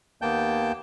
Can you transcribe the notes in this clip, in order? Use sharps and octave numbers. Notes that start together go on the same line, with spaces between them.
D#2 A#3 B3 G5 A5 G6